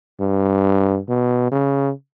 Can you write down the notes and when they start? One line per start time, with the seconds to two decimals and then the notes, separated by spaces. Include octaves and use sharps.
0.20 G2
1.08 B2
1.52 C#3